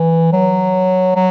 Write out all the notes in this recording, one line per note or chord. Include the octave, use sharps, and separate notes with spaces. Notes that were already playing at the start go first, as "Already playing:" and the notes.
Already playing: E3
F#3
F#3